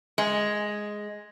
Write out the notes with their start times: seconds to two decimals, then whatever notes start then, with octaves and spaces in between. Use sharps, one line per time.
0.18 G#3